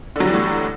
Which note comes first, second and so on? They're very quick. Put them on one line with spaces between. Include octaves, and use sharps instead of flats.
D3 F#3 G3 E3 A2